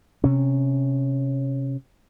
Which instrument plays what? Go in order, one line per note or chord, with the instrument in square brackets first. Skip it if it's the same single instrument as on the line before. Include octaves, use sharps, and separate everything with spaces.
[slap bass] C3 C#4